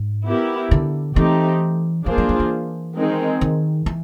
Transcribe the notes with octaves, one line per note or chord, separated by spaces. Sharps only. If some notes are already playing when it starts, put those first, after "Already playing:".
Already playing: G#2
B3 E4 G4 A#4
D3
E3 A3 C4 D#4 G4
F3 A#3 D4 F4 G#4 C5
F#3
F#3
E3
D#3 G#3 C4 D#4 G#4
D#3
E3